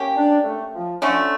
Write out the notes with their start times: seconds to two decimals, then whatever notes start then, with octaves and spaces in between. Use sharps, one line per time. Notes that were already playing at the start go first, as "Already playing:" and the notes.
Already playing: A#3 C#4 G4
0.17 D4
0.45 A3
0.74 F3
1.02 D3 F3 A3 C#4